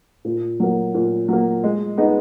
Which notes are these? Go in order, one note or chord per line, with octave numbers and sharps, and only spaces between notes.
A#2
F#3 A#3
A#2
F#3 A#3
G#3
B3 D#4 G#4